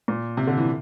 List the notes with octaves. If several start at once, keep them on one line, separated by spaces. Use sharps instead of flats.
A#2
C3
D3
E3